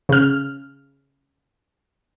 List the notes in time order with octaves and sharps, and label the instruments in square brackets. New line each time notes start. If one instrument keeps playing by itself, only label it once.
[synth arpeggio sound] C#3 F6